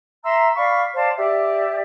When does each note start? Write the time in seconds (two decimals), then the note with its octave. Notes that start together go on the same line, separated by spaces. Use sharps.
0.24 E5 A#5 C6 E6
0.55 D5 F5 B5 C#6
0.95 C5 D5 F5 A5
1.16 G4 D5 E5